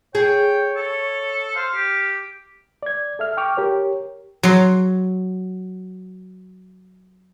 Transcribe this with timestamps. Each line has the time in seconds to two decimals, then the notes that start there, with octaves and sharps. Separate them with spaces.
0.15 G#4 C#5 G5
0.76 A4
1.56 C5 F5
1.75 G4
2.83 D5 G#6
3.19 A4 E5 F6
3.37 G5 C#6 D6 F6
3.57 G4 A#4 C#5
4.43 F#3 C6